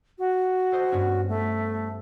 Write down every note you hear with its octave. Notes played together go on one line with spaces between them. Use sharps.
F#4
A4 C5 D#5
G2 B3 C#4
A3